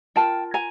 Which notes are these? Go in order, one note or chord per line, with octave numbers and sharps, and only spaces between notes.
F4 A#4 G5 A5
G#5 A#5